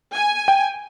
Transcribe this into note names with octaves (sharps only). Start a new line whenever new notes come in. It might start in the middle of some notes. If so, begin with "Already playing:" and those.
G#5
G5